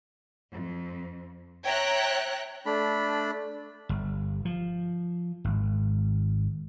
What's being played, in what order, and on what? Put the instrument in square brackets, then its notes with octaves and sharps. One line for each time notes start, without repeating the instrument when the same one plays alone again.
[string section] F2
C#5 E5 G5 A#5 F#6
[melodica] A3 D4 B5
[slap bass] G1
F3
G#1